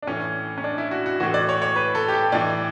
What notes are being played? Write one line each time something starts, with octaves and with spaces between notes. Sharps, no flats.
D4
A2 E3 C#4
C#4
D4
E4
F#4
F#4
A2 E3 F#4
D5
C#5
C#5
B4
A4
G4
A4
A2 E3 D5